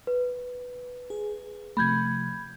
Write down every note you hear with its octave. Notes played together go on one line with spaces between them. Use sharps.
B4
G#4
C3 F3 A3 B5 G6 G#6